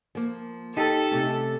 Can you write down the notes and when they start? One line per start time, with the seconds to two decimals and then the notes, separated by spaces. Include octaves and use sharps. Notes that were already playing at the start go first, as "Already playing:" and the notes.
0.15 F3 A#3
0.77 D#4 G4 A4
1.11 C3 A3 C#4